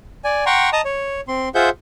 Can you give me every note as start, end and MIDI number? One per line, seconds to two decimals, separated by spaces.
0.24 0.45 74
0.24 0.45 80
0.46 0.70 78
0.46 0.70 79
0.46 0.70 82
0.46 0.70 84
0.46 0.70 85
0.73 0.81 75
0.73 0.81 81
0.73 0.81 82
0.73 0.81 87
0.85 1.21 73
1.28 1.49 60
1.28 1.49 84
1.55 1.69 65
1.55 1.69 68
1.55 1.69 72
1.55 1.69 76
1.55 1.69 78
1.55 1.69 91